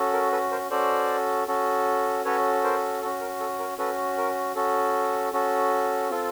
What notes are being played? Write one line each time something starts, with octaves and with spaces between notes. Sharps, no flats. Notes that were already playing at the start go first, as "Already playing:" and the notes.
Already playing: C#4 F#4 A4
A#4
A4 B4
A#4 C5
C#4 F#4 A4 C5 D5
C#4 F#4 A4
C#4 F#4 A4 B4 C#5
A#4 C5
C#4 F#4 A4
A#4
A4
A#4
C#4 F#4 A4 B4
A#4
C#4 F#4 A4
C#4 F#4 A4
C4 F4 A4